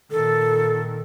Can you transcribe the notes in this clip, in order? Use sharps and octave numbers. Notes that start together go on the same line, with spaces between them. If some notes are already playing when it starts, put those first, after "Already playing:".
A#2 D#3 A4